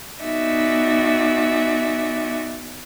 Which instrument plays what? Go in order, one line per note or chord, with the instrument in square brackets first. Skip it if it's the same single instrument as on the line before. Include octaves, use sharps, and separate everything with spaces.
[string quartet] B3 D#4 F#4 D5 E5 G#5